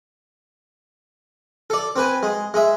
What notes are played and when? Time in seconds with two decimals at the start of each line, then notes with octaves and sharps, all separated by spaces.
1.70 A4 D5
1.96 C4 B4 G#5
2.23 G#3
2.54 G#3 E5